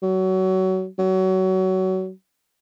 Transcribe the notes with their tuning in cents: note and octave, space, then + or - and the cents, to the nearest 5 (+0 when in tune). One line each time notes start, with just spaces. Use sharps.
F#3 +25
F#3 +25